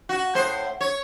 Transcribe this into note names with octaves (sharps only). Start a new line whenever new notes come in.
F#4
A2 C5
C#5